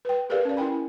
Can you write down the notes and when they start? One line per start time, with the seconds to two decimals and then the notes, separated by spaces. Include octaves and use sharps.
0.05 B4 G5
0.30 G4 G#4 A#4 B4 D5 F5
0.45 C#4 D5
0.57 E4 A#4 G5 G#5 B5